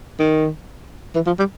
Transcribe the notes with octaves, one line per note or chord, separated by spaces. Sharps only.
D#3
E3
F3
G3